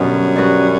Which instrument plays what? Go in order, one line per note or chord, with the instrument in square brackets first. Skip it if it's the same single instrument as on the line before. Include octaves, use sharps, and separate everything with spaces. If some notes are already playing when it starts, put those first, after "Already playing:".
Already playing: [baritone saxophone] F#2 [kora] B2 D3 G3 B3
[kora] G3 B3 F#4 B4